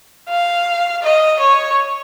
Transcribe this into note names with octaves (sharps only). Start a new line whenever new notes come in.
F5
D#5
C#5